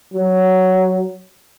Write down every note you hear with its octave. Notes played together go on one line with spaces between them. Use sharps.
F#3